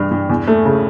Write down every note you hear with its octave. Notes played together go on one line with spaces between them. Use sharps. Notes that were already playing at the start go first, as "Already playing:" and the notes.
Already playing: G2 E3 G3
G2
E2
A3
C#3